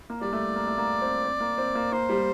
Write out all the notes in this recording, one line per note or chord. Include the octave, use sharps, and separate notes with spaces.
A#3
G3 D5
A3
A#3
A3
A#3
C4
C4
A#3
C4
A#3
A#3 C5
G3